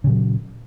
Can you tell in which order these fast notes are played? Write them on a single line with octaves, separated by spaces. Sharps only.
C#3 A#2 F#3